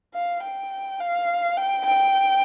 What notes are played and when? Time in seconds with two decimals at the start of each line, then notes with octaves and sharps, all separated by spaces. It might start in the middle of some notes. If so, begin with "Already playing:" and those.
0.14 F5
0.43 G5
1.00 F5
1.57 G5
1.85 G5